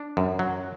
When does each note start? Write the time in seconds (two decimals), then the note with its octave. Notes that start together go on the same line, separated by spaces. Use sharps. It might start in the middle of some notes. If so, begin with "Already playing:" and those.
Already playing: D4
0.17 F#2
0.39 F#3